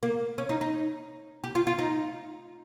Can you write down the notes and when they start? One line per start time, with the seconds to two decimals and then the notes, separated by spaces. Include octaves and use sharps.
0.03 A#3
0.38 C#4
0.49 D#4
0.61 D#4
1.44 G4
1.55 F4
1.67 F4
1.79 D#4